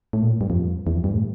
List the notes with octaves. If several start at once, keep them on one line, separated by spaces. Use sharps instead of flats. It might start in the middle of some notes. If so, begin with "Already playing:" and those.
A2
A#2
A2
G2
F2
E2
F2
G2
A2